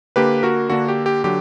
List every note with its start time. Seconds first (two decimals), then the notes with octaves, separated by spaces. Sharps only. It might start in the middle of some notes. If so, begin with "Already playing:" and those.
0.16 D3 A#3 D4 G4 B4
0.43 F#4 A#4
0.70 D3 A#3 D4 F#4
0.88 G4
1.06 G4
1.24 D3 F#3 G4